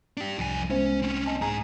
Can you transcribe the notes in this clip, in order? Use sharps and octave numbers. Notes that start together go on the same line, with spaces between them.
D4 G4
C2 F2 G#5
G#3 B3 C#4 C5
C4 C#4
D#5 G#5 A5
G#2 G#4 G#5 A#5